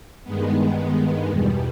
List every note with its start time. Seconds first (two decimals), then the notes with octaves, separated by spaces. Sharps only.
0.24 G2 D#3 G#3 B3
1.28 E2 B2 G3